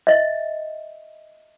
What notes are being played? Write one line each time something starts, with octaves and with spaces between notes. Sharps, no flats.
D#5 E5